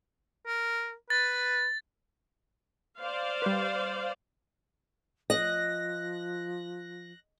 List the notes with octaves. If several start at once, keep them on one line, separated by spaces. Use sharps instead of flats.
A#4
B4 A6
C5 D5 F5
G3 B4
F3 D#5 F#6 A#6